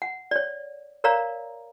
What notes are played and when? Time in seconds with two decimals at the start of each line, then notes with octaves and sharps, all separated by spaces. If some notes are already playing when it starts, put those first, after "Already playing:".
0.02 F#5
0.31 C#5 D5
1.04 A#4 C#5 D5 F5 A#5